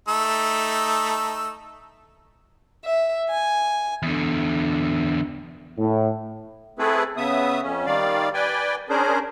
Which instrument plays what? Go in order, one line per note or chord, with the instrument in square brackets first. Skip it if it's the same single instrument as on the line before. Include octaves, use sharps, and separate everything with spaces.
[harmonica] A3 D#4 E6
[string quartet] E5
G#5
[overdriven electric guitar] E2 D3
[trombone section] A2
[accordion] A3 C4 E4 G#4 A4 B4
C#3 B3 E5 D#6
F2 C#4
D#3 G3 D5 F5
B4 D5 G5 G#5
C#4 D4 G#4 A#4 C5